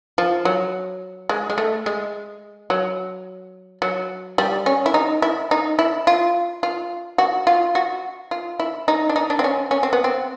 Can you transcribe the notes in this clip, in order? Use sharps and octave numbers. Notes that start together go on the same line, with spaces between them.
F3
F#3
G#3
G#3
A3
G#3
F#3
F#3
G3
C#4
E4
D#4
E4
D#4
E4
F4
F4
F#4
F4
F#4
F4
E4
D#4
D4
D#4
D4
C4
C#4
C#4
C4
B3
C4